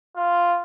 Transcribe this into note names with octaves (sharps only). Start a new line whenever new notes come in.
F4